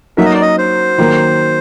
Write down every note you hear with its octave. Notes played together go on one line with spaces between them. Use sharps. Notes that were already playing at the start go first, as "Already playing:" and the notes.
F#3 A#3 D#4 F#4 A#4 E5
D#5
D5
D#5
C5
D#3 F#3 A#3